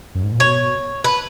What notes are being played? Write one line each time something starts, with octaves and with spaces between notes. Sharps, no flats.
F#2
G#2
A#2
B2 C#5
B4